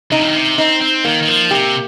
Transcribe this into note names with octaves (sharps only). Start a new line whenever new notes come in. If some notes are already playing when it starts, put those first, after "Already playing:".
C3 D#4
F3
D#3
C3
C4 D#4
C4
D#3 A#3
D#3
F3
C3 G4